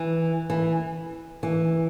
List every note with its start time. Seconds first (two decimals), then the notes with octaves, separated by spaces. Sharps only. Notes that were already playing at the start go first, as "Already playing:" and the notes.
Already playing: E3
0.50 E3
1.43 E3